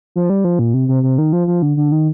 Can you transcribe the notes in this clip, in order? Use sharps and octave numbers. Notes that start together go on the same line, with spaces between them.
F3
G3
F3
A#2
C3
C3
C3
D#3
F3
F3
D3
D3
D#3